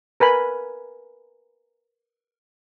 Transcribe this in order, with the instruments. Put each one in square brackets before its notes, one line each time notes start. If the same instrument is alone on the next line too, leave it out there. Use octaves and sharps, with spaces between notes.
[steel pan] A#4 B4 G#5 B5